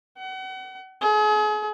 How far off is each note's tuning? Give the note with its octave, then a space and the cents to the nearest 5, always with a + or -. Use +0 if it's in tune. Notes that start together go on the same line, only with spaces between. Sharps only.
F#5 +35
G#4 +35